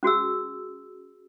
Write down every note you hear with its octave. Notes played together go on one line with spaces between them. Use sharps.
C#4 F#4 G#4 E6